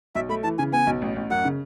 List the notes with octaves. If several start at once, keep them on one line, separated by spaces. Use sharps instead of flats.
B1 E5
A3 B5
E3 A5
C#3 G#5
B3 G#5
B1
A1
A1
F#2 F#5
C#3